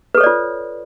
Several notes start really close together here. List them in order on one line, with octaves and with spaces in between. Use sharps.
B4 A4 C#5 D5 F4